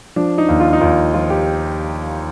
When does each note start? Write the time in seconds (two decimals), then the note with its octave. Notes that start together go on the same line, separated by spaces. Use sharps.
0.16 F3 D4
0.38 D#4
0.48 D#2
0.60 F4
0.73 D#4
0.80 D#2 F4
1.14 F3 F4
1.30 G4